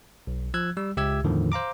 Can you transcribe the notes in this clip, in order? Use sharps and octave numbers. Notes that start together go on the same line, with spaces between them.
B1
F3 E6 F#6 G#6
G3 E6
C#2 G4 E5 E6 G#6
E2 A2 D3 D#3 F3
C5 F5 A#5 D6